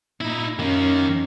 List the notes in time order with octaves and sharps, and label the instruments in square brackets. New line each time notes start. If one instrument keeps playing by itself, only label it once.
[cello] A#2 [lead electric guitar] D#4 E4
[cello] F#2 C#4 [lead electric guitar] D#3 A#3